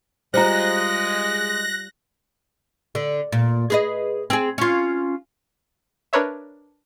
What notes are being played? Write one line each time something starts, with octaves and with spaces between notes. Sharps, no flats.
G3 G#3 F4 C5 A#5 F#6 A#6
D3
A#2
G#4 B4 D#5
C4 G#4
C#4 F4
D4 A#4 B4 C#5 E5